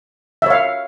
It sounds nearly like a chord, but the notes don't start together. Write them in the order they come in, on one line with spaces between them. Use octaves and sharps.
E5 C#5 F5